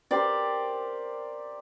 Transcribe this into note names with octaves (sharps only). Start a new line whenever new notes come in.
G4 A#4 C5 D5